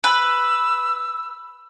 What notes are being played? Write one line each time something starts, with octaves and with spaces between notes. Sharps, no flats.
B4 E6